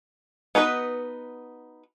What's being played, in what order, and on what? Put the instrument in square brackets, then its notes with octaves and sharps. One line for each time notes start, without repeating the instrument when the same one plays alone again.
[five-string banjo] B3 D#4 F#4 B4